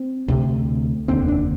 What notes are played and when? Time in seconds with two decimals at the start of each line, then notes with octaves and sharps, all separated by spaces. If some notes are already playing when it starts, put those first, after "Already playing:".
Already playing: C4
0.28 D2 C3
1.08 F1 D#2 D3 C4
1.28 D4